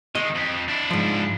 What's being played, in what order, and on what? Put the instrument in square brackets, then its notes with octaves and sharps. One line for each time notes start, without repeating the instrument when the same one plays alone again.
[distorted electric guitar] D#3 G#3 [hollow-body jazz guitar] D#5
[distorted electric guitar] F2
D4 E4
[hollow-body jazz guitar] G#2 F3